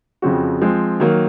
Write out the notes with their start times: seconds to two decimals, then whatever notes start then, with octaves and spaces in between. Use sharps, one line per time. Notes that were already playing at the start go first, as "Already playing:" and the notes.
0.22 F2 C#3 F3 C4 F#4
0.61 F3 G#3 C4
1.00 D#3 F#3 A#3